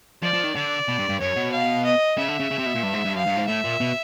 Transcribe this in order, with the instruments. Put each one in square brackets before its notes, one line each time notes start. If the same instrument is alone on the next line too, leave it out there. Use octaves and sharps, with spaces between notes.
[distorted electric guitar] F3 [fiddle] D5
[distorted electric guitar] F3
D#3
[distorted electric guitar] D3 [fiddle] D5
[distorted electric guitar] B2
G2
G2
[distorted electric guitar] F#2 [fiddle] C#5
[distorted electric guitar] B2
[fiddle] F5
D#5
[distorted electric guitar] C#3 [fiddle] E5
[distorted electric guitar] D3
C#3
C#3
C3
B2
A#2
G2
G#2
G2
[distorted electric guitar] F#2 [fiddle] F5
[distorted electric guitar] G2
G#2
[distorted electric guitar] A2 [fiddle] E5
[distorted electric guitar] A#2
B2